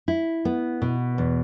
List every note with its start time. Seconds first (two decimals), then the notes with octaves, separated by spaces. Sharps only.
0.08 E4
0.45 B3
0.82 B2
1.18 E2